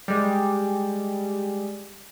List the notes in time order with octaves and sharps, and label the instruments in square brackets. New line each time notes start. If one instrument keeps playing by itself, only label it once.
[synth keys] G3 G#3